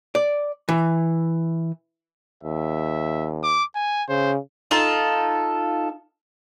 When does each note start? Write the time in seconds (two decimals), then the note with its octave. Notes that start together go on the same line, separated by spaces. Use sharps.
0.15 D5
0.69 E3
2.44 D#2 E5
3.43 D6
3.75 G#5
4.09 C#3 C5
4.71 D#4 F4 A4